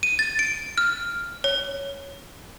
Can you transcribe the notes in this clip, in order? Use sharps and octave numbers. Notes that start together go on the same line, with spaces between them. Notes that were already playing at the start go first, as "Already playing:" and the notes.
D#7
A6
D7
F6
C#5